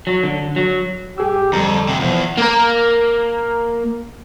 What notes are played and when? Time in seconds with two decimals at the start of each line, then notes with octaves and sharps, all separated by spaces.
0.07 F#3
0.23 D3
0.56 F#3
1.18 G2 G4 G#4 E6
1.53 F2 D3 G3 A4 A#5
1.88 F2 C3
2.00 E2 B2 F3
2.37 A#3 A#4